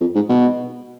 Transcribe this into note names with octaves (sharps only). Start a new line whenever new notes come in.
F2
G#2
B2